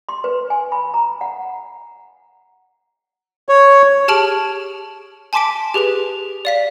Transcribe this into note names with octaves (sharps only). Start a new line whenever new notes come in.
C6
B4
G#5
B5
A#5
F#5
C#5
G4 G#4 A5 F6 D7 F#7
G#5 A5 C6 D6 B6 D7
G4 G#4 B4 F7
D5 F5 B6